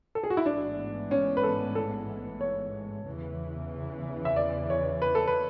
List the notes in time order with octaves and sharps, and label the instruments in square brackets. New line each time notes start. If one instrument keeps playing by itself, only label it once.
[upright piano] A4
G#4
F#4
E4
[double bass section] A1 G#2 E3 G#3 B3 [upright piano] D4
[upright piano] C#4
B4
A4
A4
C#5
[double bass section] E2 C#3 E3
[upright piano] E5
D5
C#5
B4
A4
B4